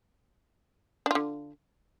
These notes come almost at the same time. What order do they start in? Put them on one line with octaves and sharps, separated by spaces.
D4 F4 D3